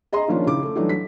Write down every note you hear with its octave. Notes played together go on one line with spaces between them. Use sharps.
G#4 D#5 A#5 C6
D#3 F3 A#3 C#4 D4 F4
C#3 D#4 E4 D6
A3
E3 F#3 G3 A3 D4 D#4
B6